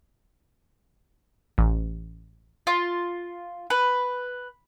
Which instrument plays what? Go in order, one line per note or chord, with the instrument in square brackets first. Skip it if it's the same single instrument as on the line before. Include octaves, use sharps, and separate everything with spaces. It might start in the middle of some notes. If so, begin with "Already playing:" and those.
[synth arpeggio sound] A1
[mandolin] F4
B4